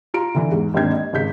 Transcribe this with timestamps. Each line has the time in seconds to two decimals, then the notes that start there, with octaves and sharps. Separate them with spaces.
0.14 F4 A#5 D7
0.35 D3 E3
0.51 E2 G#2
0.74 G#1 D#2 C4 D4 G#6
0.92 D#5
1.13 G#1 C#3 G6 B6